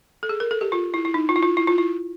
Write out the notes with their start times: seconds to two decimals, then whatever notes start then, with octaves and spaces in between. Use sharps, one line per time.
0.23 A4
0.29 G#4
0.40 A#4
0.51 A4
0.61 G4
0.72 F4
0.94 E4
1.05 E4
1.14 D#4
1.29 F4
1.36 E4
1.43 F4
1.57 E4
1.67 F4
1.78 E4